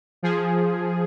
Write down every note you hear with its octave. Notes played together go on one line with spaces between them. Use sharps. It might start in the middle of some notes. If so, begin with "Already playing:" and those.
F3 G#4